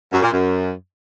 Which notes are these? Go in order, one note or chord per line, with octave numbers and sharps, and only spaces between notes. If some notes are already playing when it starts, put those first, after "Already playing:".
F#2
A#2
F#2